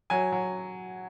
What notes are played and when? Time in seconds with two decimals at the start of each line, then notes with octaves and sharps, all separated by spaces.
0.10 F#3 G#5
0.32 F#3